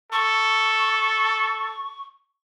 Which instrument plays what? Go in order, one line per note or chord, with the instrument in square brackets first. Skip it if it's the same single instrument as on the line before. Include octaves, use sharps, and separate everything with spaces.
[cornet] A4 [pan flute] C#6